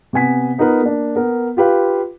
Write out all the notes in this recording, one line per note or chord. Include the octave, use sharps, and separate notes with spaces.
C3 B3 G#5 B6
B3 D#4 F4 A#4 B4
A#3 D4
B3 A#4
F4 G4 B4 F5